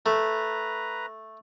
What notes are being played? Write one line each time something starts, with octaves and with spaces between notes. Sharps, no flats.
A3 B4 A#5